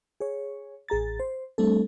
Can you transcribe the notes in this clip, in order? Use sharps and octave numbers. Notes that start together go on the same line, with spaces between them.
G#4 C#5
A1 G#4 A#5 A6
C5
G3 A3 C4 D4 A4